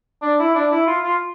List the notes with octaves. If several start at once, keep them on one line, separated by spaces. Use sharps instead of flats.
D4
E4
D4
E4
F4
F4